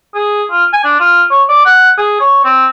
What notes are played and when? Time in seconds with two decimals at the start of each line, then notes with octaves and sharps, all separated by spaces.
0.15 G#4
0.51 F4
0.73 G#5
0.84 D4
1.00 F4
1.31 C#5
1.49 D5
1.65 F#5
1.98 G#4
2.20 C#5
2.44 C4